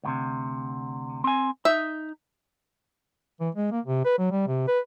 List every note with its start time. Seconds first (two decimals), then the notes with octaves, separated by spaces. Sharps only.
0.04 D2 A2 C3
1.24 C4 G#5
1.65 D#4 E5
3.40 E3
3.55 G#3
3.72 A#3
3.85 C3
4.05 B4
4.19 F#3
4.31 G3
4.47 C3
4.68 B4